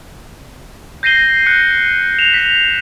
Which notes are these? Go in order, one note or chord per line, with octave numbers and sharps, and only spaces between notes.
G6 A#6 C7 D#7 G7
F#6 A#6 C#7
E7 F7
B6